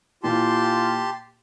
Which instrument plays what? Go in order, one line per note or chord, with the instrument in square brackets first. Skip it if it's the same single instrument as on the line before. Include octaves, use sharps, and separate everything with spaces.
[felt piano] A#2 E3 [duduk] F4 [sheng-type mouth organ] G4 A5 C6